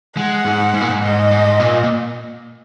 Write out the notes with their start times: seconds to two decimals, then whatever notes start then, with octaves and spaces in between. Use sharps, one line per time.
0.17 G#3 F#5
0.45 G#2
0.74 G#2
0.81 A#2
0.90 G#2
1.02 G#2 D#5
1.31 G#2
1.60 A#2
1.84 A#2